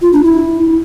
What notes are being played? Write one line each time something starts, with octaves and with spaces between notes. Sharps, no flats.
F4
D4
E4